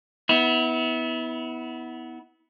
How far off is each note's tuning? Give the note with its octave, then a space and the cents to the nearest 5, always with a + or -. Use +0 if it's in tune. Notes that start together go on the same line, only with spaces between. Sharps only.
B3 +0 E4 -30